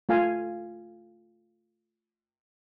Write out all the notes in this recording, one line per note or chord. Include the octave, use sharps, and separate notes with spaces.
A3 F4 F5 G#5